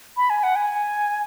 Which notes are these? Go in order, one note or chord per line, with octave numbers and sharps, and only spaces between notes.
B5
G#5
F#5
G#5